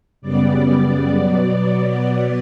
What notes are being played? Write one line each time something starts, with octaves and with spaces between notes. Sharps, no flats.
F#2 C#3 G3 B3 D5
B2 F#3 B3
D5